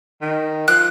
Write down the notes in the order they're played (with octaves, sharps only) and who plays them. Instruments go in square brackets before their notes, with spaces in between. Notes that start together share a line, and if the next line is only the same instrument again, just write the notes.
[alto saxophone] D#3
[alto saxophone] F3 [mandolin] F#6